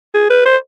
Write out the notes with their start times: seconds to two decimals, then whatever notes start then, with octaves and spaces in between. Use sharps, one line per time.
0.14 G#4
0.30 B4
0.45 C5